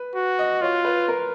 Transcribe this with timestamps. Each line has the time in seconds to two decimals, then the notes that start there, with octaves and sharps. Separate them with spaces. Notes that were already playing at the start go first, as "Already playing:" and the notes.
Already playing: B4
0.15 F#4
0.39 D#5
0.62 F4 C#5
0.85 B4
1.08 A#4